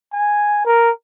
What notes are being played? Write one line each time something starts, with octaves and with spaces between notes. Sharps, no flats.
G#5
A#4